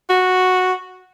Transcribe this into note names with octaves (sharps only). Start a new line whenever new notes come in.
F#4